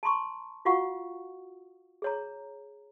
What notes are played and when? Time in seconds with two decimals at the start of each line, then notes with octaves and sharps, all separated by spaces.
0.03 A5 A#5 C6 C#6
0.65 F4 F#4 F5 F#5 C#6
2.02 G#4 C#5 A#5